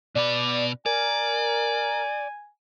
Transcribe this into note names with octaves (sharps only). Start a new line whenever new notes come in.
B2 B4 D5
A#4 D5 G#5